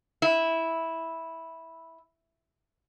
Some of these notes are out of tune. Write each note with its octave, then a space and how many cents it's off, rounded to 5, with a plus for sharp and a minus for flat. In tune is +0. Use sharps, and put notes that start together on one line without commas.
E4 -10